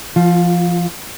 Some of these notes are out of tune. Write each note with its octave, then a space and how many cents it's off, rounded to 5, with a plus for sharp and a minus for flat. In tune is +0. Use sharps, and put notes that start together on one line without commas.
F3 -20 F4 +20